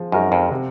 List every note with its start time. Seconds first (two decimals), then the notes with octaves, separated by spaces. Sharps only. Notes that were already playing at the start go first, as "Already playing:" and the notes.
Already playing: F3 G#3
0.12 F#2 G#3 D#4 F#4 A#4
0.32 F2
0.51 C3